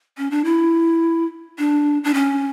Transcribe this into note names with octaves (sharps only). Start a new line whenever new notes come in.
C#4
D4
E4
D4
D4
C#4